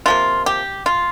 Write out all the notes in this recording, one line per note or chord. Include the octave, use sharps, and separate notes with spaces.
C3 F3 A#3 F4
G4
F4